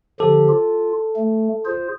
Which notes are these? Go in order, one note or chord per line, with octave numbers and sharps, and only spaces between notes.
D3 F3 G4 A4
F4
A3
F4 G#4 C5